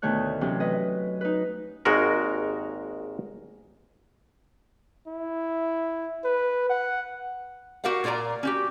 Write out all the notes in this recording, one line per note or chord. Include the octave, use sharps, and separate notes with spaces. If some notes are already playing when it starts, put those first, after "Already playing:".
D2 B2 D#3 A3 C#5 F#6
C3 E3 F#3 C#4
B4 D#5
D#4 B4
G#1 D#2 G#3 F#4 A#4
E4
B4
F#5
F#4 G4 A#4 F5 F#5
A#2 F4 A#4 D5 A#5
C#4 F#4 G4